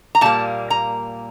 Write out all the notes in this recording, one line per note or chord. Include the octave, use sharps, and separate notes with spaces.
A#5
A#2 G3 A#3 A5
A#5